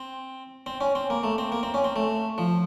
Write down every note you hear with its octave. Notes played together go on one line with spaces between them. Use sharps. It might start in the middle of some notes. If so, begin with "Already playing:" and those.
Already playing: C4
C4
C#4
C4
A#3
A3
C4
A#3
C4
C#4
C4
A3
F3